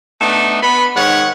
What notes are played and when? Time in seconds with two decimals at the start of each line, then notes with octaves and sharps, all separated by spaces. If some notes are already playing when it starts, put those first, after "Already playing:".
0.20 A3 B3 D4 D#4
0.62 B3 B5
0.95 G#2 D#3 C#5 F#5